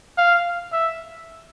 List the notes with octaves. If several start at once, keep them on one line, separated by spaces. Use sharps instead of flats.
F5
E5